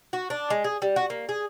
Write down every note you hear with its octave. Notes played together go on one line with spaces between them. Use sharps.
F#4
D4
G#3
G#4
G3
F#4
A#3
G#4